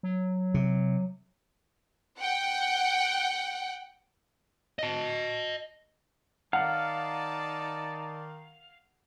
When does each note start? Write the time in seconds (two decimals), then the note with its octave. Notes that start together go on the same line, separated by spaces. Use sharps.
0.03 F#3
0.54 C3
2.18 F#5 G5
4.79 D#5 A5
6.53 D#3 D#4 D5 F5 F#5 A5